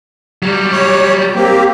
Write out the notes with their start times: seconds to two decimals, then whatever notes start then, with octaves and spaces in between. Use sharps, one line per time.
0.43 F#3 G3
0.72 C#5
1.35 A#3 C4 G4